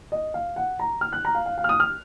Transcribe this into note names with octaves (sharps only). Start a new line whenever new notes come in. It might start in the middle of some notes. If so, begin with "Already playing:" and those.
D#5
F5
F#5
A#5
F6
F#6
A#5
F5
F5
F5
F6
D#6
F6